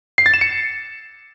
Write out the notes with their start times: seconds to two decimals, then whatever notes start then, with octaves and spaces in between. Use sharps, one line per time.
0.18 C7
0.26 A6
0.34 E7
0.41 C#7